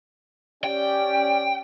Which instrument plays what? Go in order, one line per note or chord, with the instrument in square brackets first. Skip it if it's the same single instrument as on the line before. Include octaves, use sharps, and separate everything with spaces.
[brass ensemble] C#4 G4 D5 [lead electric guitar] G5